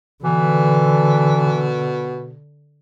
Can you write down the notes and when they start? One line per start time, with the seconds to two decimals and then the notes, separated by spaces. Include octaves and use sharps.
0.24 B2 D3 E3